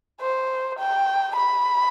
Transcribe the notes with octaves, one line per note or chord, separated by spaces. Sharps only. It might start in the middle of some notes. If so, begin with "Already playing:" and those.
C5
G5
B5